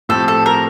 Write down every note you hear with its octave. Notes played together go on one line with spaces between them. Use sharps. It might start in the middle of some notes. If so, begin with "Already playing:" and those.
A2 F3 A3 C4 G4 A4
A4
A#4